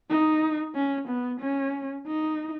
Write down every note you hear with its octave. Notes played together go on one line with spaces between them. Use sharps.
D#4
C#4
B3
C#4
D#4